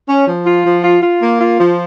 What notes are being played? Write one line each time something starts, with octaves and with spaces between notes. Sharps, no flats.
C#4
F3
F4
F3
F4
F4
A#3
F4
F3